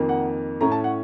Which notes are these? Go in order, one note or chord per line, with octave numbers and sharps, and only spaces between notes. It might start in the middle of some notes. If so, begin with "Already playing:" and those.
Already playing: F2 D#3 A#3
F#5
A2 A3 C#4 A#5
A5
F#5